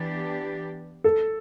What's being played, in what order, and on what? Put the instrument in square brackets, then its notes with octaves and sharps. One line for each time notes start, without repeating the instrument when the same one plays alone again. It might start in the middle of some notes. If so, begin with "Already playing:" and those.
Already playing: [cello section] E3 B3 D4 G4
[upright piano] A4